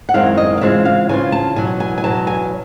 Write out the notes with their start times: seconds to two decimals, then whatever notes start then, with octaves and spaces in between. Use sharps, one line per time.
0.09 F#5
0.14 F#2 D#3 G#3 C4 E4 F5
0.37 D#5
0.57 F5
0.61 C#3 E3 G#3 C4 F4 E5
0.85 F5
1.09 C#3 E3 G#3 C4 F4 G#5
1.32 A5
1.56 E2 B2 F#3 G#5
1.80 G#5
1.98 G#5
2.04 E2 B2 F#3 A5
2.27 G#5